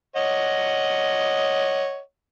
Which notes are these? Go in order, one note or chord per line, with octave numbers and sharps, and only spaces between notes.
C#5 D#5 F#5